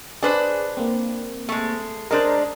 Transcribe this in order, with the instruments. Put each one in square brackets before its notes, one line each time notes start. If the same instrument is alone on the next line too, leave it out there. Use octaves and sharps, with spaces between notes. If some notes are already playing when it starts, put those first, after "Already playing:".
[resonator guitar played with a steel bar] D4 B4 C5 [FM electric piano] G#4
[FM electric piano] A#3 C4
[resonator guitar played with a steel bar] G#3 A3
[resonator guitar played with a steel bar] G#3 D4 [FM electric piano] A#4 C5